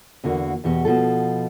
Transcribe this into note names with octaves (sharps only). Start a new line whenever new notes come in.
E2 D3 A#3 F#4
E2 B2 F#4 G4
B2 F3 A4